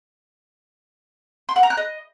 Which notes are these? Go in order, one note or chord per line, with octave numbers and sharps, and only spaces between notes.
C6
F#5
A#5
F#6
D#5